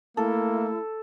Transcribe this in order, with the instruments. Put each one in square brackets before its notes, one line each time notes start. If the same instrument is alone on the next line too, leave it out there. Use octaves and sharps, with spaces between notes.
[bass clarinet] A3 [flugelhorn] A#3 [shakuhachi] E4 [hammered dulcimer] A4